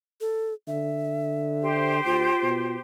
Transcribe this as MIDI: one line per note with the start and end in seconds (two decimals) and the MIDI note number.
0.21 0.53 69
0.67 2.01 50
0.67 1.97 76
1.61 2.80 67
1.61 2.80 72
2.05 2.29 38
2.05 2.75 65
2.43 2.77 47